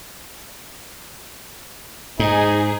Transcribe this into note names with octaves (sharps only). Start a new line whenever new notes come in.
G#2 D#4 G#4